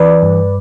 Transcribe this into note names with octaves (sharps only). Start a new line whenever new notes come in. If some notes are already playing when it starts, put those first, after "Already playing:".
Already playing: E3 B4 D5
G2